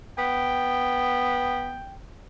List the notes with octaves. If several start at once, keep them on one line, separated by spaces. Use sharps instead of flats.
B3 G5